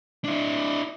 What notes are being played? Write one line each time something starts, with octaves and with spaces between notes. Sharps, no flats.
D4 E4